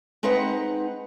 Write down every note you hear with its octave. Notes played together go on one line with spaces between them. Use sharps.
G#3 C4 D#4 B4 F#5